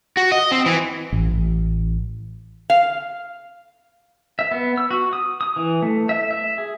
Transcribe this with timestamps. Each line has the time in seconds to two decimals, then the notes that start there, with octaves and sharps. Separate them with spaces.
0.17 F#4
0.32 D#5
0.52 C4
0.66 E3
1.12 A1
1.32 A1
2.70 F5
4.39 E5
4.51 B3
4.78 E6
4.91 F#4
5.13 D#6
5.41 D#6
5.56 E3
5.82 A3
6.09 E5
6.31 E5
6.58 G#4